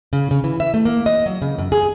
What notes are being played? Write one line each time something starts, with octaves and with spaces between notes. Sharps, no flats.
C#3
C#3
E3
E5
A3
A#3
D#5
F#3
C#3
F#2
G#4